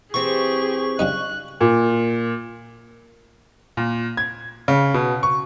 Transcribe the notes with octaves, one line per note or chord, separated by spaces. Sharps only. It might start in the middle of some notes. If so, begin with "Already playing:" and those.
E3 C4 G4 G#4 C#6
C#3 G3 D#4 F#6
A#2
A#2
G#6
C#3
B2
C#6